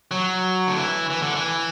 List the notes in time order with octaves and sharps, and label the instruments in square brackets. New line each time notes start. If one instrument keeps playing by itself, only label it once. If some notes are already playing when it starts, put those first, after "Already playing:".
[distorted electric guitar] F#3
D3
E3
E3
D3
E3